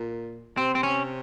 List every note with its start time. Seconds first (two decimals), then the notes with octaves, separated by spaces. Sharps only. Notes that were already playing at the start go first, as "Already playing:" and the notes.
Already playing: A#2
0.57 C3 C4
0.75 C4
0.83 C#4